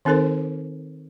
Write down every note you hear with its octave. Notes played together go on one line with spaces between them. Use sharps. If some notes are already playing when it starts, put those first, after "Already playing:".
D#3 C4 D#4 A4 A#4 C5